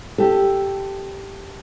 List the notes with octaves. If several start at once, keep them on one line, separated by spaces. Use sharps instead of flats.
G4 A4